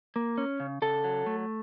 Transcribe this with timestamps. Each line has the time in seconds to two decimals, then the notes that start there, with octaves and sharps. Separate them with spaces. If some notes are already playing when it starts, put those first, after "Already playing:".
0.16 A#3
0.38 C#4
0.60 C#3
0.82 C#3 A4
1.04 F#3
1.26 A3